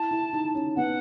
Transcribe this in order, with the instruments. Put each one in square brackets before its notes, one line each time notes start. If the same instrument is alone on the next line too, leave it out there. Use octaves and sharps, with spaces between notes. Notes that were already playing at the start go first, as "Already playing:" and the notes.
Already playing: [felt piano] E4 [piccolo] A5
[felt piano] E4
D#4
C#4
[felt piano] B3 [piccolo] F#5